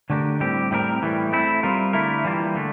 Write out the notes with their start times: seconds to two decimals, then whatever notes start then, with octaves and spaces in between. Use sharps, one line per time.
0.10 D3 A3 D4 G4 A#4
0.40 A2 G3 C4 G4
0.71 A2 G3 C4 G4 A#4
1.02 A2 E3 G3
1.32 A3 C4 E4
1.63 G3 C4 F4 A#4
1.93 D3 A3 E4 A#4
2.24 E3 G3 A#3 F4
2.55 D3 A3